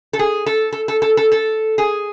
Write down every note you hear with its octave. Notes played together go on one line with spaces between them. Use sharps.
A4
G#4
A4
A4
A4
A4
A4
A4
G#4